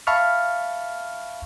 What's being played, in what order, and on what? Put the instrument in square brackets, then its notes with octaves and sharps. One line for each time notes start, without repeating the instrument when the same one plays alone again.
[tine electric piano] E5 F5 A5 B5 C#6 F6